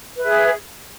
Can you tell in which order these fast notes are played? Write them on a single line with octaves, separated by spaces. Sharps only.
B4 E5 G#4